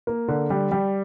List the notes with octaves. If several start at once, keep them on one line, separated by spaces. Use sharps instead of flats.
A#3
D3
G3
G3